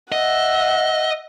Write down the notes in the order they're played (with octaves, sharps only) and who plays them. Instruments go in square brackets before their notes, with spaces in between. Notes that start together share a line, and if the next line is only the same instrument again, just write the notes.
[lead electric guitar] D#5 [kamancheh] E5 F#5